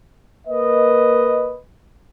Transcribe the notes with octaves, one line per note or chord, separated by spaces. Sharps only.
A#3 B4 D#5